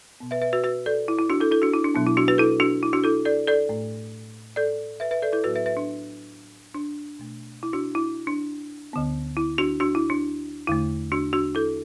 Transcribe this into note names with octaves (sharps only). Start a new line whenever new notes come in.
B2 B3
B4 E5
B4 E5
F#4 B4
F#4 B4
A4 D5
E4
E4
D4 F#4
E4 A4
E4 A4
D4 F#4
E4
D4
B2 F#3 B3 D4
E4
D4 F#4
F#4 B4
E4 A4
D4 F#4
E4
D4 F#4
E4 A4
A4 D5
A4 D5
A2 A3
A4 D5
B4 E5
B4 E5
A4 D5
E4 A4
A2 F#3 B3 F#4 B4
B4 E5
B4 E5
D4
D4
B2 A3
E4
D4 F#4
E4
D4
D2 D3 B3
E4
D4 F#4
D4 F#4
E4
D4
E2 D3 A3 E4
D4 F#4
D4 F#4
E4 A4